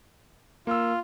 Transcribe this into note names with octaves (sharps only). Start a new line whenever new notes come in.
A#3 F4 E6